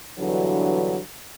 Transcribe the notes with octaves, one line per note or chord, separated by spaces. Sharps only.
E2 G2 D3 E3 F#3